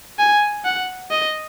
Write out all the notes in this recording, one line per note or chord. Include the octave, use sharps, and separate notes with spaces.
G#5
F#5
D#5